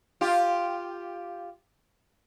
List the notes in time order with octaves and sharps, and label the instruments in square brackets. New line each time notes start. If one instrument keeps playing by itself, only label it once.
[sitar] F4 G4